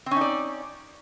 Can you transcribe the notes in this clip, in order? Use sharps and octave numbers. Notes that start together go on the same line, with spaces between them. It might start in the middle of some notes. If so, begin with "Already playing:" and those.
C4 C#4 D#4 D5